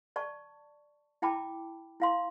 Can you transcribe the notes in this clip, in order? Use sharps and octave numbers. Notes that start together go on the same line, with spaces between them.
D5 A5 C#6
E4 G5 A5 B5 D6
E4 F5 C6